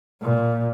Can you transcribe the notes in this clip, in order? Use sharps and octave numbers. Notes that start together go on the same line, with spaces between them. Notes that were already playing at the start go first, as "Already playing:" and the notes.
A#2